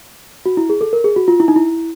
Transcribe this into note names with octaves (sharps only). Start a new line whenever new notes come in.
F#4
E4
G#4
A4
A#4
G#4
F#4
F4
E4
D#4
E4